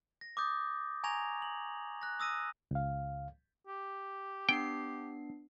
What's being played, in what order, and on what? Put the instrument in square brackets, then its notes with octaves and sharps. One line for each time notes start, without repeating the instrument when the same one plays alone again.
[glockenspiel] A#6
D6 D#6 G6 A6
G#5 A#5 C#6 G#6 A#6 F7
F#7
F#6 A#6
D#6 E6 A#6 D#7
[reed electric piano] C#2 F5
[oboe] G4
[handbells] B3 D4 C7 [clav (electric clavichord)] G5